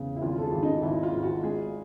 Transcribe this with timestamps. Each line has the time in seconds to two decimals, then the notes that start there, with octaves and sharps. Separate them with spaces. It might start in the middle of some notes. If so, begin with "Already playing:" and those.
Already playing: E2 C#3
0.16 E4
0.22 G#1 F4
0.38 A4
0.42 G#4
0.52 G#1
0.63 D#4
0.82 G#1 E4
1.03 F4
1.13 G#1
1.23 F#4
1.43 G#3 G#4